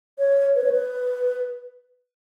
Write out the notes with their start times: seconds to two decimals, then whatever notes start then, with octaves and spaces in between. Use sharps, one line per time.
0.18 C#5
0.56 B4
0.64 C#5
0.72 B4